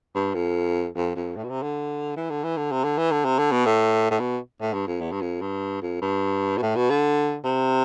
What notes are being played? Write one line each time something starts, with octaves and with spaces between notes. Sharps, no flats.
G2
F2
F2
F2
A2
B2
C3
D3
E3
D3
E3
D3
C3
D3
E3
D3
C3
D3
B2
A2
A2
B2
A2
G2
F2
E2
G2
F2
G2
F2
G2
B2
A2
B2
D3
C3